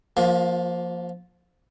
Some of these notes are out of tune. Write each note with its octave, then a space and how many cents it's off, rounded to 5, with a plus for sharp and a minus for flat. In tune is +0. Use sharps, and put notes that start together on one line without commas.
F3 +0 A#3 +0 F4 +40